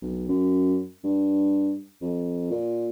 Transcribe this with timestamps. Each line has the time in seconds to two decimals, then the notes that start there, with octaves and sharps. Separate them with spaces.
0.02 B1
0.28 F#2
1.04 G2
2.02 F2
2.51 A#2